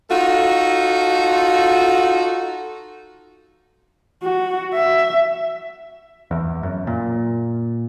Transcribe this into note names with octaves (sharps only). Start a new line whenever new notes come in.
D#4 F4 F#4 A4
F#4
E5
E2
F#2
A#2